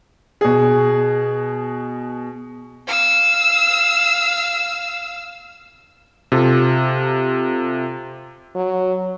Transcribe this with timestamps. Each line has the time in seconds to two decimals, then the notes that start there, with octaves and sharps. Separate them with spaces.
0.41 B2 G#4
2.87 F5 E6
6.32 C3 F4 A4
8.55 F#3